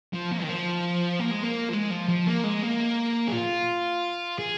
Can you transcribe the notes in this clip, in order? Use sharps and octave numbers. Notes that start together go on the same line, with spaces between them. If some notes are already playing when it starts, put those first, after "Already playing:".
F3
A#3
D#3
F3
A#3
G#3
A#3
F3
G#3
F3
F3
A#3
G#3
A#3
G#4
F4
G#4